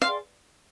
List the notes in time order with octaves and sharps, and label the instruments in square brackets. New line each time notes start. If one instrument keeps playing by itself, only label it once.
[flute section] G#4 D5 G5 C6 [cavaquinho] F5